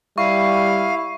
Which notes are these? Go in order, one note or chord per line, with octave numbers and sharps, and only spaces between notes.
G3 E4 F5 C#6